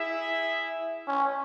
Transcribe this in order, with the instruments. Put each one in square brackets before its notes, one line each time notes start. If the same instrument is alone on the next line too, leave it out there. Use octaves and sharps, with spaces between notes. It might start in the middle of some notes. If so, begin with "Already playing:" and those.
Already playing: [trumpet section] E4 G#4 E5
[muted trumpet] C#4